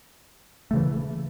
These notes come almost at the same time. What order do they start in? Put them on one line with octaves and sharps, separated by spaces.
A3 C#3 E3